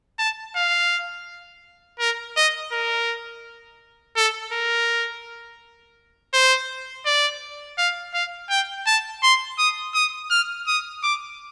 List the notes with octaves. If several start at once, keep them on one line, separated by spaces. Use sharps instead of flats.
A5
F5
A#4
D#5
A#4
A4
A#4
C5
D5
F5
F5
G5
A5
C6
D#6
D#6
F6
D#6
D6